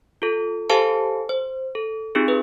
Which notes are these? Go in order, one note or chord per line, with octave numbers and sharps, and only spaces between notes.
F4 A4
G4 A4 C5 F5 G#5 A5
C5
A4
C4 D#4 F4 G4 G#4
G#4 B4